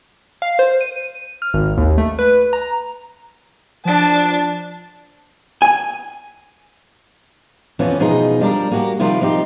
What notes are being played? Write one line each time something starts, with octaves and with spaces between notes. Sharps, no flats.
F5
C5
D#7
F6
G#1
D#2
A3
B4
A#5
F3 D4 A5
G#5
F2 E3 F3 B3 C#4
E2 B2 F3 D#4 G4 G#4
F3 G3 D4 A#4
A#3 F#4 G4
C3 D#3 F3 G3 E4 F4
F3 C4 D#4 G4